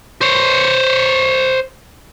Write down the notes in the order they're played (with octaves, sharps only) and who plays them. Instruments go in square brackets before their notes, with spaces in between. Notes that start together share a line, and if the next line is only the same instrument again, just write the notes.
[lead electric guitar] C5 C#5